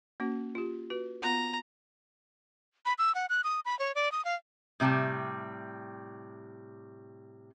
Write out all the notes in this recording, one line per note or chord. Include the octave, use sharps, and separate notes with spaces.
A#3 C#4 F#4
F4 G4
F#4 B4
B3 F4 F#5 A#5
B5
E6
F#5
F#6
D#6
B5
C#5
D5
D#6
F5
A2 C3 G3 G5 A5